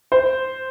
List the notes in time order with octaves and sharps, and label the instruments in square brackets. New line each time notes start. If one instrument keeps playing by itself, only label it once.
[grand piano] C5